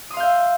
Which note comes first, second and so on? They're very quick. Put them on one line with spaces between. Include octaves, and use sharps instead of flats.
D#6 C6 F5 G6 E5